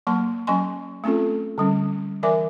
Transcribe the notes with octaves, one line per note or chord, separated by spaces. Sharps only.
F#3 A#3 A5 C6
F#3 C#4 D#5 G#5 C6
A3 C4 C#4 F4 A4
D3 G3 C#4
E3 A#4 D5 E5 G#5 D6